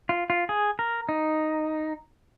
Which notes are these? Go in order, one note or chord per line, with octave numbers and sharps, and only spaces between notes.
F4
F4
G#4
A#4
D#4